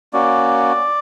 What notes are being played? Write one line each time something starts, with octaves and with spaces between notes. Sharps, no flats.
A#3 C#4 F#4 D5